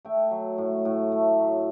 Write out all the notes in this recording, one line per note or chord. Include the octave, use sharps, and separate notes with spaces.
A3 E5 G5
F#3
A2
A2
A3
F#3